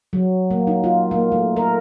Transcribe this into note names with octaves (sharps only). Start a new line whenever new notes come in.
F#3
A#3
D#4
F4
A#3
A3
A#4